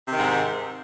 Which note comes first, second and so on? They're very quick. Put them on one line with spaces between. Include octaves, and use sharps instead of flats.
C3 D#3 G#2